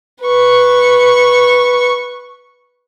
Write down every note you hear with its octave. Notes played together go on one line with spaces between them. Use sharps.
B4 C#6